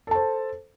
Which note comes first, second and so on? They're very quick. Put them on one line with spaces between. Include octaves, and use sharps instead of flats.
A4 A5 C5